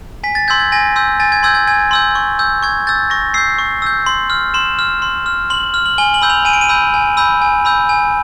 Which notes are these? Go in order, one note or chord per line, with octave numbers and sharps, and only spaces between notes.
G#5 B6
A6
C6 E6 G6 G#6
G#6
G#5 A#6
C6 E6 G6
G#5 A6
G#6
C6 E6 G6 G#6
G#6
G#5 G#6
C6 E6 G6
C#6
E6 G6
C#6 G#6
E6 G6 A6
C#6 A#6
E6 G6 C7
C#6
E6 G6
C6
F6
C6 E7
F6
C6
F6
C6 F#7
F6
F#7
G#5 G7
F#7
B5 E6 G6
F7
G#5 D#7
D7
D#7
B5 E6 G6
G#5
B5 E6 G6
G#5
B5 E6 G6
G#5